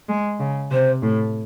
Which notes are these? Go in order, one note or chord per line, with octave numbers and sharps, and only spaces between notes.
G#3
C#3
C3 C5
A2